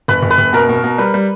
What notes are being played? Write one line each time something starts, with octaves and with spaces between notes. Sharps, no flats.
F#1 B4
F#1
B4
F#1
B2 A#4
B2
B2
G3 B4
G3